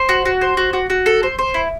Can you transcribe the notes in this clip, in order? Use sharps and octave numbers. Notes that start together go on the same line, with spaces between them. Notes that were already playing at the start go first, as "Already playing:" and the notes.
Already playing: C5
F#4
F#4
C5
F#4
F#4
F#4
A4
C5
C5
E4